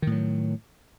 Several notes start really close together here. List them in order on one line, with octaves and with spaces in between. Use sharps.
D#3 A2 F#3